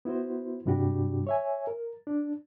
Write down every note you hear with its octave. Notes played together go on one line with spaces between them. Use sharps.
B3 E4 F#4 C5
G2 C3 G3 D4 F#4 G4
C#5 E5 G#5
A#4
D4